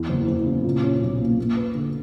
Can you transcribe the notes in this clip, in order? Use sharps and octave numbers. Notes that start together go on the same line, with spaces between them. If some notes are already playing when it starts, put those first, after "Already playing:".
Already playing: E2
F#1
F#1
C#3
A#2
C#4
B1
A#3
A#3
B4
D3